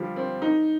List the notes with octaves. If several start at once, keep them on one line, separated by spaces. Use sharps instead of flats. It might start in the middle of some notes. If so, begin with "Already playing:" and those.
Already playing: D3 F3 G3
C4
D#4